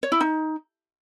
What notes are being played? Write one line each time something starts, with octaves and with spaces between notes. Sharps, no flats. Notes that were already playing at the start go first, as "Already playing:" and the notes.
C#5
E4
D#4